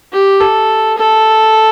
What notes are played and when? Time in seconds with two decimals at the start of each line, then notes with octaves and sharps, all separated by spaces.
0.13 G4
0.41 A4
0.98 A4